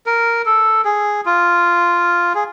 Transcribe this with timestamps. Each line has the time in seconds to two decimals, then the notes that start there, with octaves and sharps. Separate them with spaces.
0.06 A#4
0.46 A4
0.85 G#4
1.26 F4
2.35 G#4